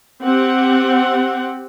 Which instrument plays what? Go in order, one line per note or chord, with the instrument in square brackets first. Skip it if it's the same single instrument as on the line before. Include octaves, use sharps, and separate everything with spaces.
[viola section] C4 G4 F#5